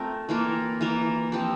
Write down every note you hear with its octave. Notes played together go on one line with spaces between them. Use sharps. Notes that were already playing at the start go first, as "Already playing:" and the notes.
Already playing: A3 C4 F4 A#4
E3 A#3 F4 A#4
E3 A#3 F4 A#4
F3 C4 G4